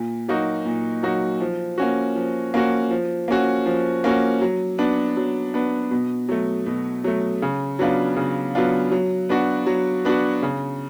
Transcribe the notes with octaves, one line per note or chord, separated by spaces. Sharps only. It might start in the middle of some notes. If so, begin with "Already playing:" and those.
Already playing: A#2
F#3 A#3 D#4 F#4
A#2
F#3 A#3 D#4 F#4
F3
A#3 C#4 F#4
F3
A#3 C#4 F#4
F3
A#3 C#4 F#4
F3
A#3 C#4 F#4
F#3
B3 D4
F#3
B3 D4
B2
F#3 A3
B2
F#3 A3
C#3
F#3 B3 D4 F4
C#3
F#3 B3 D4 F4
F#3
B3 D4 F#4
F#3
B3 D4 F#4
C#3